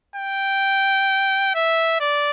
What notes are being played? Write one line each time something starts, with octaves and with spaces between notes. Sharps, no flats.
G5
E5
D5